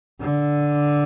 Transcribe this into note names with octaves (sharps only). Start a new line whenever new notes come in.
D3